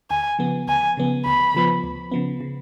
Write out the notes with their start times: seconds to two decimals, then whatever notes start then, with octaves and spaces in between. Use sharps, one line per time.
0.10 D2 G#5
0.39 C#3 F3 B3
0.67 D2 G#5
0.97 C#3 F3 B3
1.26 D2 B5
1.54 C#3 F3 B3
1.84 D2
2.12 C#3 F3 B3
2.41 C#3